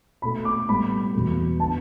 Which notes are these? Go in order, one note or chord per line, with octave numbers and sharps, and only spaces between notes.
B2 A3 B5
D6
A2 G3 B3 B5
E2 B2 A3
D3 B3 A5